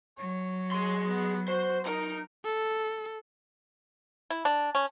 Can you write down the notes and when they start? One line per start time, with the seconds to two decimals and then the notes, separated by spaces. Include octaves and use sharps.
0.18 F#3 C#5
0.71 G#4 C6
1.06 B3
1.48 F#4 C5
1.86 D#4 A#4 A#5
2.45 A4
4.30 E4
4.45 D4
4.75 C#4